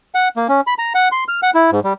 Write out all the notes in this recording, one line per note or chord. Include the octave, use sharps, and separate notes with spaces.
F#5
A#3
C#4
B5
A#5
F#5
C6
F6
F#5
E4
G#2
G3